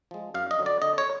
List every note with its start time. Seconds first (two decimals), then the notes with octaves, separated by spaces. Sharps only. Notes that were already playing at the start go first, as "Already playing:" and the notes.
0.11 F3 G#3
0.34 F#2 F5
0.51 D#5
0.59 D3 F#3
0.66 D5
0.82 D3 D#5
0.98 C#5